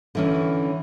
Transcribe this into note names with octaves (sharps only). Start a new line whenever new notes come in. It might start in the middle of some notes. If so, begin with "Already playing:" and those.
D3 E3 C#4